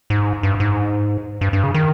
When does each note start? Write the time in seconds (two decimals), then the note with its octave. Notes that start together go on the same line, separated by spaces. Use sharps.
0.10 G#2
0.43 G2
0.60 G#2
1.41 G2
1.53 G2
1.64 C#3
1.74 D#3